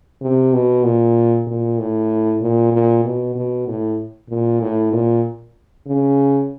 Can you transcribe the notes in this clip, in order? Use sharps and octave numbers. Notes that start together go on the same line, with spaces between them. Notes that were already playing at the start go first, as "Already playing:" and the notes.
C3
B2
A#2
A#2
A2
A#2
A#2
B2
B2
A2
A#2
A2
A#2
C#3